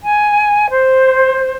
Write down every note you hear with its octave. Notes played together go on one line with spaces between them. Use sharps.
G#5
C5